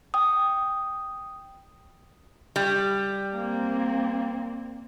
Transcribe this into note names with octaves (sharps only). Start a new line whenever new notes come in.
G5 D#6
G3
A#3 C4